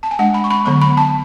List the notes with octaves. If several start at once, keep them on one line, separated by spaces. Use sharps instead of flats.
A5
G#5
G#3 D4 F#5
B5
C#6
B5
D3 F#3 B3 C#6
B5
A5